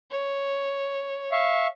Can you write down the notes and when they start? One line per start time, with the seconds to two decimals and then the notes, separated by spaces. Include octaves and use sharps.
0.11 C#5
1.32 E5 F5 C#6